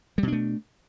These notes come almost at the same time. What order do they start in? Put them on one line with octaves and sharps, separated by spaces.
G3 B2 D4 A3